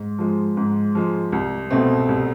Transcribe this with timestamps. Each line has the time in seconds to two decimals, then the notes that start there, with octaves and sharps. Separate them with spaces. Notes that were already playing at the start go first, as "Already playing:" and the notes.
Already playing: G#2
0.19 F3 G#3
0.57 G#2
0.95 F3 G#3
1.32 C2
1.71 B2 A3 C4
2.09 C2